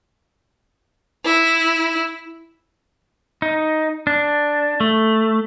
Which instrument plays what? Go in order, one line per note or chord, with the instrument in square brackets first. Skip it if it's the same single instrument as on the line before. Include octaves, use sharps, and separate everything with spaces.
[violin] E4
[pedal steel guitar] D#4
D4
A3